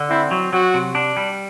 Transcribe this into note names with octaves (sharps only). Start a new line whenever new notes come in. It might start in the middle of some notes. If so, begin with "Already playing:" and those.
Already playing: D3
C4 E4
F#3
F#3 F#4
C3
D4
G3